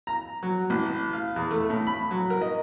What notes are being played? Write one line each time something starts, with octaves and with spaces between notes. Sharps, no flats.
A#5
F#3
A1
F5
E2
A3
A2
B5
F#3
A#4
D#5